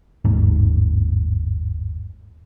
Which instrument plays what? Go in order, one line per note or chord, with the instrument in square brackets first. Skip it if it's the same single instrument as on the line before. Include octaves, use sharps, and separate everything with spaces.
[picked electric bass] G1 D#2 G#2